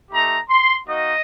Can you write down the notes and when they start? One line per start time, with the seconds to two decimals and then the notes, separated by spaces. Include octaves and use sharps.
0.10 A3 D#4 G4 A#5
0.49 C6
0.87 A#3 D#4 F#4 D#5